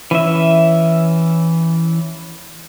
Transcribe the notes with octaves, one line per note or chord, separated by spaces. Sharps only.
E3 C#4 E5